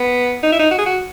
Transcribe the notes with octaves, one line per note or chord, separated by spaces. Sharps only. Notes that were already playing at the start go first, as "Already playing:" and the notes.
Already playing: B3
D#4
E4
D#4
F#4
G#4
F#4